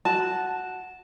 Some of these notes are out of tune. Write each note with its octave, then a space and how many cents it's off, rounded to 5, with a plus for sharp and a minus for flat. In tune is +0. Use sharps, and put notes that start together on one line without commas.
F#4 +0 A5 -10